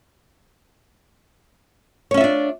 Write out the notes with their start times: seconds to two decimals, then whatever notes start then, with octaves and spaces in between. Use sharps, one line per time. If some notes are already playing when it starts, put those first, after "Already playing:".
2.11 C#5
2.14 C#4
2.17 E5
2.21 F4
2.24 D4